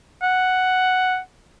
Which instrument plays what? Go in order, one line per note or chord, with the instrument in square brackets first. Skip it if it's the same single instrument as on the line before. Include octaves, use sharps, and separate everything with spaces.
[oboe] F#5